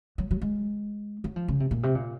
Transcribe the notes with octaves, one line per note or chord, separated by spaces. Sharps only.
F#3
F#3
G#3
F#3
F3
C#3
C3
A#2
C3
A#2